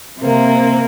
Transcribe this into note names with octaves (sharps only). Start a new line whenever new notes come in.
C3 A#3